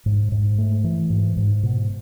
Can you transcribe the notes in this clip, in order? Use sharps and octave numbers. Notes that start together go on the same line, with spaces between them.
G#2
G#2
A3
E3
G#2
G#2
B2